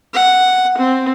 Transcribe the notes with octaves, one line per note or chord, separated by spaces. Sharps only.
F#5
C4